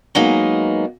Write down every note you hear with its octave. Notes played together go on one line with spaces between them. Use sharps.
F#3 G#3 A#3 B3 D#4